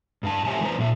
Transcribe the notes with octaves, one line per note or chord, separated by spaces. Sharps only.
G2 F5 A5
G4 C5 C#5 E5 G#5 A5
E3 G3 B4 C5 A#5
A#2 E5